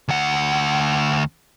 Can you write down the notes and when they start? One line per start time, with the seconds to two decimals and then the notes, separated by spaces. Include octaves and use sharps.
0.08 D2 F#5